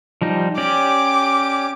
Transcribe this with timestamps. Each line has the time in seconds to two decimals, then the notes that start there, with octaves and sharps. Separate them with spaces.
0.22 F3 G3 D#4
0.58 C#4 G4 D5 D6